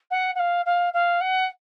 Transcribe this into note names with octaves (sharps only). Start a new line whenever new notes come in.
F#5
F#5
F5
F5
F5
F#5